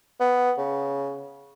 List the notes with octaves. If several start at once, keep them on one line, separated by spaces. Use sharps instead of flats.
B3
C#3